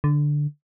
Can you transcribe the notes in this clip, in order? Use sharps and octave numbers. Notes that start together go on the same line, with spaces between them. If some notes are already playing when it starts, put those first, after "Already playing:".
D3